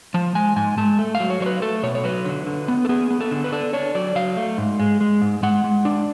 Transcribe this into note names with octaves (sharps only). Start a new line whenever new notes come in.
F3 A5
G#3 G#5
G#2 G#5
G#3 A5
A3
F5
F#3
C#5
F#3 C#5
B4
A3 A4
B2 C#5
C#5
F#3 B4
D3
D3
B3
A4
B3 G#4
B3
A4
D3
B4
D4 A4
D4 C#5
F#3 D5
F#3 F5
A3
G#2
G#3
G#3
G#2
G#3 F#5
G#3
D4